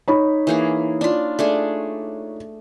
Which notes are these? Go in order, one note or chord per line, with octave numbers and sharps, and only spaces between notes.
D#4 C#5 B5
E3 A#3 G#4
D4 F4
A3 D4 G#4